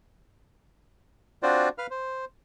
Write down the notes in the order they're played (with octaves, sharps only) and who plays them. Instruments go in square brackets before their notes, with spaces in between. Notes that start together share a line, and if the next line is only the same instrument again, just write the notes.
[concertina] C4 D4 F4 F#4 C5 D5
B4 F5 F6
C5